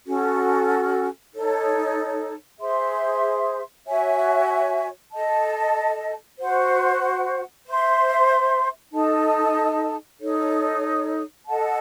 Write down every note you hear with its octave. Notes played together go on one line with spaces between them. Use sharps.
C#4 F#4 A4
D#4 A4 C#5
G#4 C5 E5 C6
F#4 C#5 E5 G#5
A4 D#5 A5
F#4 C5 F#5
C5 E5 C6
D#4 A4 D#5 A5
D#4 A4 C#5
A4 D#5 F#5 A5